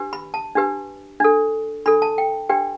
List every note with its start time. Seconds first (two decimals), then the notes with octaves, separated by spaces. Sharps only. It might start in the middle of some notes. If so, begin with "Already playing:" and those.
Already playing: D4 G4 B4
0.13 B5
0.34 A5
0.55 D4 G4 B4
1.20 D4 A4
1.86 D4 A4 B5
2.02 A5
2.18 G5
2.49 D4 G4 B4 G5